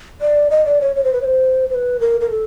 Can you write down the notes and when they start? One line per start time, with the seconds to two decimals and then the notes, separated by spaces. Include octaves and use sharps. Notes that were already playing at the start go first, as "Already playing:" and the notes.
0.21 D5
0.51 D#5
0.65 D5
0.81 C#5
0.96 C#5
1.04 C5
1.13 B4
1.21 C#5
1.25 C5
1.70 C5
1.75 B4
2.00 A#4
2.21 A#4
2.31 A4